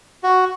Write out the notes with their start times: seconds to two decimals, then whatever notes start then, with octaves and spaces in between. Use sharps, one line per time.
0.23 F#4